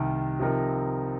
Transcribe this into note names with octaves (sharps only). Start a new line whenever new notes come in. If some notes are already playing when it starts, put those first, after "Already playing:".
Already playing: C2 C3 D#3
C3 F3 C4 D#4 A#4